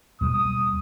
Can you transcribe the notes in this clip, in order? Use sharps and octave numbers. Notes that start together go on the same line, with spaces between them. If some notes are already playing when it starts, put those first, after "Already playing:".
D#2 B2 G3 D#6